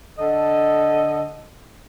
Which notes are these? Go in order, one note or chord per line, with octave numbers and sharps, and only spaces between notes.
D3 A4 D#5